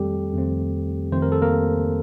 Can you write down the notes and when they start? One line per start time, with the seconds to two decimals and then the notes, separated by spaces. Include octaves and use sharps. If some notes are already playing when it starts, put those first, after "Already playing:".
Already playing: F2 D#3 G3 A3 C4 G4 A4
0.34 F2 D#3 A3 C4
1.12 F2 D#3 A3 C4 C5
1.22 A#4
1.32 A4
1.42 A#3 A#4